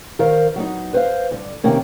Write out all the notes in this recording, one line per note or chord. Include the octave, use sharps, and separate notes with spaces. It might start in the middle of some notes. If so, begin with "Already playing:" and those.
D#3 A#4 C5 F5
F#3 B3 D#4
B4 C5 E5 F5
G2 D3
C3 D#3 A#3 C#4